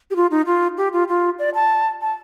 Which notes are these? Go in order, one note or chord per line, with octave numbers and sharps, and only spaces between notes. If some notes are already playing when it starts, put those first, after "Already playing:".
G4
F4
D#4
F4
G4
F4
F4
D5
A5
A5